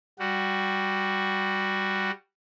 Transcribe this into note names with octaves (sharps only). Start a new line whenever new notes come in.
G3 F#4